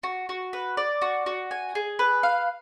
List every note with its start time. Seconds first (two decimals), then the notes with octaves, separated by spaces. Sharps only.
0.03 F#4
0.29 F#4
0.53 B4
0.77 D5
1.02 F#4
1.26 F#4
1.51 G#5
1.75 G#4
1.99 B4
2.23 F5